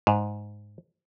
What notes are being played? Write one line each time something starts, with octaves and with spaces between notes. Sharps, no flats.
G#2